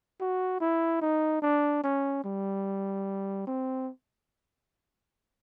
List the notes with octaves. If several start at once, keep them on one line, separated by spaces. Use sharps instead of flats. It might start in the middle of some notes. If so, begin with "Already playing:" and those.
F#4
E4
D#4
D4
C#4
G3
C4